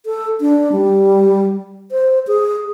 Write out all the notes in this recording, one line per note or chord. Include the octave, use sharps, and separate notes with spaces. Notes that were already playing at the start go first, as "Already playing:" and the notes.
A4
D4
G3
C5
G#4